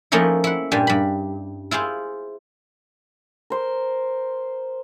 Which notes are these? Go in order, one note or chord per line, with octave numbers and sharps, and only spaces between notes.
F3 A3 A#3 C#4 D#4 E4
E4 F#5
G2 A#2 G3 G#5
G2 B5
E4 F4 G#4 C5
A#4 C5